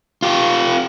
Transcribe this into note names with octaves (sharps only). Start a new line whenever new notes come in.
F4 G4